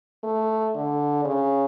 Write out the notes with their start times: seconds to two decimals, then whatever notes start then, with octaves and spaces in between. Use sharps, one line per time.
0.24 A3
0.75 D3
1.25 C#3